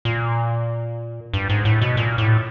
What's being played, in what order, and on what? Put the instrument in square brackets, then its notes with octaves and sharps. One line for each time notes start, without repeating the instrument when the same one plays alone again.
[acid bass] A#2
G2
G#2
A2
B2
A#2
A2